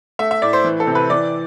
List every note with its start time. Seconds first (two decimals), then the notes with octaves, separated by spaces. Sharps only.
0.19 A3 E5
0.31 E5
0.42 A2 D5
0.53 C5
0.64 E3
0.80 A4
0.87 C3
0.95 B4
1.10 E3 D5